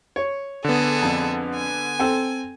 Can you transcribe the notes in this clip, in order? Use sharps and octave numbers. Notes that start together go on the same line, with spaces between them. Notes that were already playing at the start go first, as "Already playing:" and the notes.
C#5
D3 B3 G#4 A4
F2
G#5
C4 A4 G5